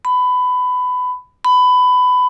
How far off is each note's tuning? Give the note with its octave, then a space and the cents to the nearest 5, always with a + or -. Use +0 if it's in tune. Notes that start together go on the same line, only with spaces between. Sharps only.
B5 +20
B5 +20